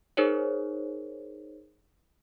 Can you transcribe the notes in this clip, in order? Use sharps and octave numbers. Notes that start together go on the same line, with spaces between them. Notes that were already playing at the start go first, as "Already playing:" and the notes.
D#4 G#4 A#4 C5 C#5